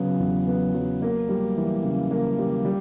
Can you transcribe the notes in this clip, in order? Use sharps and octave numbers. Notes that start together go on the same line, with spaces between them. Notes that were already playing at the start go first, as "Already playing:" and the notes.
Already playing: C#3 F#3 B3
E2
B3
F#3
A#3
G3
E3
C#3
A#3
G3
G3